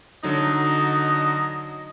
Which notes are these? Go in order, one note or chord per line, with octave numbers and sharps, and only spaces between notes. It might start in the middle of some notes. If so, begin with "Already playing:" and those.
D3 F#3 D#4 D#5